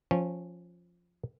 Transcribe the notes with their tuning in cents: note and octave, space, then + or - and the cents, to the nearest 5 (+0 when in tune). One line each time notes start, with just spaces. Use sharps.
F3 +0 C#4 -15